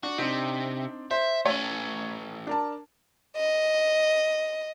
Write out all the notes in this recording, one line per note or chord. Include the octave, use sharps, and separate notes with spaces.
D4 F#4
C3 C4 D4 D#4
C5 E5
A3 C#4 C#5
D4 A#4 A5
D#5